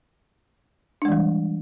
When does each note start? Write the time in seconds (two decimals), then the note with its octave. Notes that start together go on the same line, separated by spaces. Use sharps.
1.02 D4
1.05 G#3
1.08 E3
1.12 G3